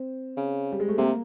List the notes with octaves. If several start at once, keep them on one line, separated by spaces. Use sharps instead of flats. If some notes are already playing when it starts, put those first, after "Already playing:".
Already playing: C4
C#3
G3
G#3
A3
C3 A#3